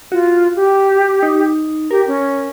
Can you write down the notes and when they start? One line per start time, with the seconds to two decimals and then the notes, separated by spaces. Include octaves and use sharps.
0.12 F4 F#4
0.56 G4
1.23 D#4
1.91 G4 A#4
2.07 C#4